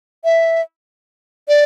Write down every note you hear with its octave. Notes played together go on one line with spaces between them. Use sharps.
E5
D5